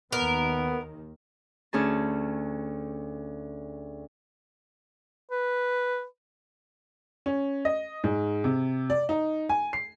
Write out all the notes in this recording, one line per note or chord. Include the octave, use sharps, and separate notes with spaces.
D#2 D#3 B3 A#4
D2 C#4 G#4 A5
B4
C#4
D#5
G#2
C3
D5
D#4
G#5
C7